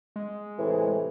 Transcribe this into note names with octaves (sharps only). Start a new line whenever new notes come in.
G#3
A2 C3 E3